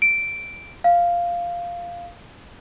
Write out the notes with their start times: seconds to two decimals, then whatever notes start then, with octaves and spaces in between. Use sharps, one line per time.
0.02 D7
0.84 F5